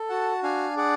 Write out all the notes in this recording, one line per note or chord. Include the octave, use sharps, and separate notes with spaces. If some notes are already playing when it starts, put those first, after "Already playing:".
Already playing: A4
F#4 F#5 A5
D4 F5 G#5
G#4 D5 F#5